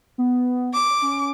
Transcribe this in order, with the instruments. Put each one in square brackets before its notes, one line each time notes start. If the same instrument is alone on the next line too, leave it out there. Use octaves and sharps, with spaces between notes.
[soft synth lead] B3
[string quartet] D6
[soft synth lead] C#4